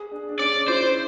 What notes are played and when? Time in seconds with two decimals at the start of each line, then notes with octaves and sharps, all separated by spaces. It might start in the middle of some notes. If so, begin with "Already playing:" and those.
Already playing: G#4
0.11 D4
0.29 D4
0.39 C#4 D5
0.68 E4 C5